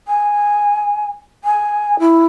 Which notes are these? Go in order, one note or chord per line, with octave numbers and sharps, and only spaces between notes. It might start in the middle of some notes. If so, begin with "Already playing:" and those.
G#5
G#5
E4